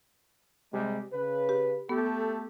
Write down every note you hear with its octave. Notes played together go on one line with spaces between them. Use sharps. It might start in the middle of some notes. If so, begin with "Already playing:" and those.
C3 G3 G#3
C#3 B4
G4
A3 B3 G4 A4